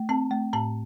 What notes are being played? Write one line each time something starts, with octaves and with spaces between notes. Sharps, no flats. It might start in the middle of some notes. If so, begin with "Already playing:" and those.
Already playing: A3
C4 A5
A3
A2 A5